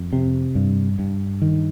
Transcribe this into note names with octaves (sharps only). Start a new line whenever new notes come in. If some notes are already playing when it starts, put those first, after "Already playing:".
Already playing: F2
C3
G2
G2
D#3